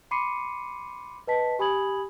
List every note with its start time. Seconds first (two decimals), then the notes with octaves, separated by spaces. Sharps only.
0.11 B5 C6 D6 C7 C#7 D#7
1.27 B4 D#5 A5 B6
1.59 G4 G#5 B5 D#6 G#6 F#7